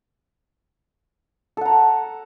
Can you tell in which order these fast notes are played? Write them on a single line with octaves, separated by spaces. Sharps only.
A4 F#5 A#5 A5